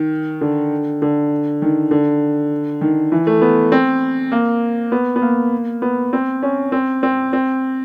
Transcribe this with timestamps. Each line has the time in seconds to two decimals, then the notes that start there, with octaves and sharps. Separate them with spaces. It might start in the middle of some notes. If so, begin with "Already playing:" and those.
Already playing: D#3
0.41 D3
1.02 D3
1.62 D#3
1.91 D3
2.81 D#3
3.12 E3
3.27 A3
3.42 B3
3.72 C4
4.32 A#3
4.92 B3
5.16 B3
5.22 A#3
5.82 B3
6.13 C4
6.43 C#4
6.72 C4
7.03 C4
7.33 C4